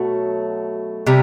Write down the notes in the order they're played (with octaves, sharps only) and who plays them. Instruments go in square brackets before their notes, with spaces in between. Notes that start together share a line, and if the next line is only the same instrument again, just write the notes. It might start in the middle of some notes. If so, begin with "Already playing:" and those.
Already playing: [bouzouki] B2 F#3 A3
C3 G3